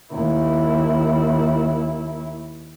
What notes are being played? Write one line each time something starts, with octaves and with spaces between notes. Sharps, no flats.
D#2 E4